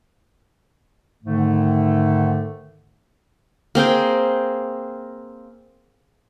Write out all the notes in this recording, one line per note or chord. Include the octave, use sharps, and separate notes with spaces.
G#2 D3 D#3 A3
A#3 C4 G#4 G5